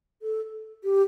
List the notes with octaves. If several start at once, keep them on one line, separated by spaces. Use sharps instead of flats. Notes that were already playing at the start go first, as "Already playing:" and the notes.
A4
G4